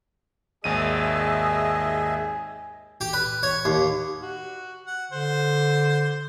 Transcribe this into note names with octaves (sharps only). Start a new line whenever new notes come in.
G#1 D#2 G#4 D#5 E5 G#5 D#7
G4
B4
C#5
D#2
F#4
F#5
D3 C5